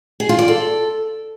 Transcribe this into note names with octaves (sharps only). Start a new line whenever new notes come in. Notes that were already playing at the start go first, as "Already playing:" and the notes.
G#4
F4
D5
A4